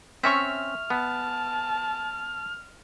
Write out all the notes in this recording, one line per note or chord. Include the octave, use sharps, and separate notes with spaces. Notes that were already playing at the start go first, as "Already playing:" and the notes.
C4 C#4 E5 C#6 F6
B3 A5